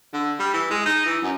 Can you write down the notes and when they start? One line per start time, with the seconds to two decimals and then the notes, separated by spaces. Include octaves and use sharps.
0.13 D3
0.39 G3
0.54 E3
0.70 G#3
0.86 D#4
1.06 E3
1.22 F#2